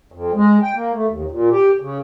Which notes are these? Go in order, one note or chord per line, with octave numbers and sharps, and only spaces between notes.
F2
G#3
G5
A#3
A3
D#2
A#2
G4
C#3